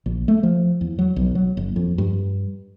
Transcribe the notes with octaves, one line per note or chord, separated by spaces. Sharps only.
A#1
A3
F3
E2
F#3
B1
F#3
F#1
F2
G2